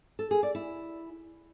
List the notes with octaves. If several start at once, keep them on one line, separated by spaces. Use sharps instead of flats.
A4
G#4
D5
E4